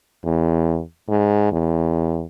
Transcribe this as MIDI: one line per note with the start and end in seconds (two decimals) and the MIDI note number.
0.24 0.80 40
1.09 1.51 44
1.52 2.24 40